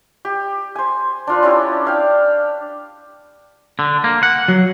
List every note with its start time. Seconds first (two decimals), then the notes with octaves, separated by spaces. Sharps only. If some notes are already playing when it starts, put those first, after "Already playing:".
0.25 G4
0.75 C5 G#5
1.27 D4 F4 B4
1.43 C#4 D4 E4 G4
1.85 D5 F5 G5
3.79 D3
4.04 A#3
4.23 F#5
4.48 F#3